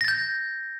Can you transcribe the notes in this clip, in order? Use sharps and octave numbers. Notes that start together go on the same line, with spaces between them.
G6 A6 A#6